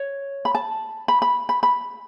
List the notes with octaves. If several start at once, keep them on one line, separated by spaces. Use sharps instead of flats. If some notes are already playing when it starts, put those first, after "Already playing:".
Already playing: C#5
B5
A5
B5
B5
B5
B5